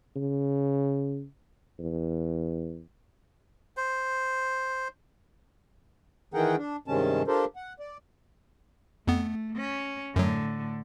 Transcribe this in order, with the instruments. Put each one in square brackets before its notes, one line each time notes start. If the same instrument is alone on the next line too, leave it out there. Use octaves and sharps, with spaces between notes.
[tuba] C#3
E2
[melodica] C5
[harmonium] D#3 E3 G#4 A#4 F#5 G5
D4
G2 C3 D#3 G#3 C#4 A5
D4 F4 G4 A4 A#4 C5
F#5
D5
[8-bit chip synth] F2 B3 [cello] A3
[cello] C#4
[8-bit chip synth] F#2 F#3 [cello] A2 D3